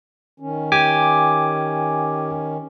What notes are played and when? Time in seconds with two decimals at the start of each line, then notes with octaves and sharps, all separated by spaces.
0.40 D#3 C#4
0.72 G4 G#5 D6